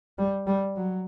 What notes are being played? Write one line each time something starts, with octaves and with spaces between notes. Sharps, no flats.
G3
G3
F#3